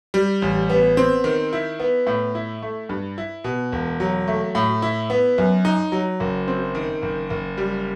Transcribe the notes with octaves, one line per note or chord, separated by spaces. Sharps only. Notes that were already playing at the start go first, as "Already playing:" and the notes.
G3
A1
B3
C4
D#3
E4
B3
A2
E4
A3
G2
E4
B2
E1
F#3
A3
A2
E4
B3
F#2
D#4
F#3
F#1
C4
D#3
F#1
F#1
G3